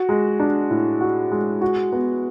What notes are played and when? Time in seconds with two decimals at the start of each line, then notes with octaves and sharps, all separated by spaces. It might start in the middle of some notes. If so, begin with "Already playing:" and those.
Already playing: F#4
0.09 G#3
0.40 D4
0.70 A2
1.01 F#4
1.31 G#3
1.61 F#4
1.93 B3